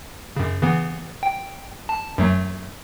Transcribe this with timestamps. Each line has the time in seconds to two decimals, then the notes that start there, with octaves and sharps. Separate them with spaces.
0.36 F#2 C#3
0.61 C#3 E3 B3
1.23 G5
1.89 A5
2.18 F#2 F#3 A3